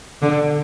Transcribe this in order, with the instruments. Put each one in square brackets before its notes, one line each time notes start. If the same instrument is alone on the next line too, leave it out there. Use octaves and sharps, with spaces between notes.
[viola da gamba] D3